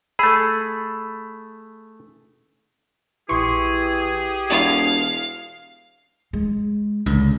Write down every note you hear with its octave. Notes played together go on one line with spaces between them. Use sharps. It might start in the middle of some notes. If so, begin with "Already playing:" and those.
A3 G#4 B5 E6
A#1 E3 G4 G#4 C6 C#6
E1 F5
G#3
C#2 D3